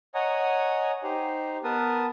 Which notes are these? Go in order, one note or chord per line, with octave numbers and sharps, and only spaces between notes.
C#5 D#5 F#5 G#5 A#5 D#6
D#4 G4 C5 A#5
B3 A#4 B4 A5 D#6